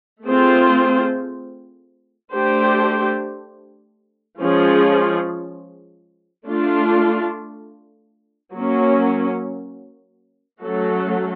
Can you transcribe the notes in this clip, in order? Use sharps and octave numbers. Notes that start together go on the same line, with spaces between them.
A3 C4 F4 G#4 C5
A3 D4 G4 C5
F3 G#3 C#4 F4 G#4
A3 D4 F4
F#3 A#3 C#4
F#3 A3 C#4 F#4 A4